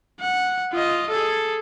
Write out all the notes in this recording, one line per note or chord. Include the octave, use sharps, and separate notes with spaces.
F#5
F4 D#5
G#4 A4